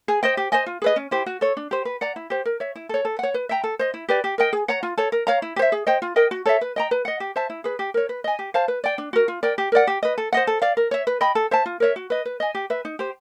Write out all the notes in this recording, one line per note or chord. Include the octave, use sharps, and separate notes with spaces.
G#4
C5 D#5 G5
G4
C5 D#5 G#5
F4
G#4 B4 D#5
C#4
E4 G4 C5
F#4
A4 C#5
D4
G4 C5
B4
D5 F#5 A#5
E4
G4 C5
A#4
C#5 E5
E4
A4 C#5
A4
C#5 F#5
B4
E5 G5 A#5
A4
C5 D#5
E4
G4 B4 D5
G4
A#4 D#5 G5
G#4
C#5 F#5 A#5
F4
A4 C#5
A#4
C#5 F5 A#5
E4
G4
C5 E5
G#4
C5 D#5 G5
F4
A#4 D#5 G5
F#4
A4 C#5 E5
B4
D#5 G5 A#5
B4
D#5 F#5
G4
C5 E5 A5
E4
G#4 B4
G4
A#4 C#5
B4
D#5 G#5
G4
C5 F5 A5
B4
D5 G5
D4
F#4 A#4
F4
A#4 D5 G5
G4
A#4 D5 F#5
G4
B4 D#5
A4
C5 D#5 F#5
A4
D5 F5
A#4
C#5 E5
B4
D#5 G5 B5
A4
C5 E5 A5
F4
A#4 C#5 E5
F#4
B4 D#5
B4
D#5 G#5
G4
B4 E5
D#4
G4 C5